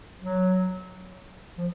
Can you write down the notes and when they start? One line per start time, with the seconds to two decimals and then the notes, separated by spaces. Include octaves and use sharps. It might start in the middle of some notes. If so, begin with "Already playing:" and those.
0.21 F#3
1.58 F3